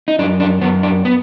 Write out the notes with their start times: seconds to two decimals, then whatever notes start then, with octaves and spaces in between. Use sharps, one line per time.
0.08 D#4
0.19 F#2 D4
0.40 D4
0.61 F#2 B3
0.83 D4
1.05 B3